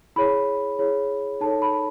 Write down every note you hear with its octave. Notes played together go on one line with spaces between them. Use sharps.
E4 G#4 C#5 B5
E4 G#4 C#5
D#4 A4 C#5 A5
B5